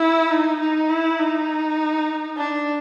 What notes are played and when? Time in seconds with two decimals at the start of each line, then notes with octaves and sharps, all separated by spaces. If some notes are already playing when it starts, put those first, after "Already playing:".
Already playing: E4
0.30 D#4
0.60 D#4
0.89 E4
1.19 D#4
2.37 D4